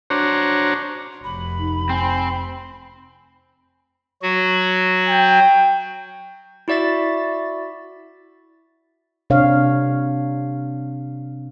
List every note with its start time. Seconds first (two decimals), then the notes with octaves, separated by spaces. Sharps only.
0.10 D4 F#4 C5 C#5 A#5
1.24 F1 B5
1.59 D#4
1.90 C4 G#5
4.22 F#3 F#4
5.09 G5
6.68 E4 F#4 D5 E5 A6
9.30 C3 D4 C#5 F5